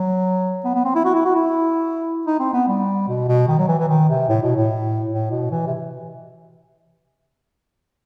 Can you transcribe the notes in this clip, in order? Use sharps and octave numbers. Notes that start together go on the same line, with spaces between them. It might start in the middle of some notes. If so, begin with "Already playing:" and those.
Already playing: F#3
B3
B3
C4
E4
F#4
E4
F#4
E4
D#4
C4
B3
G3
B2
B2
D#3
F#3
E3
E3
D#3
C3
A2
B2
A2
A2
B2
E3
C3